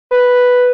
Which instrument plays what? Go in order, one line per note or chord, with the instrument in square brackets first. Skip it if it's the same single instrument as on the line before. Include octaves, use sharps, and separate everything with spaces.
[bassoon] B4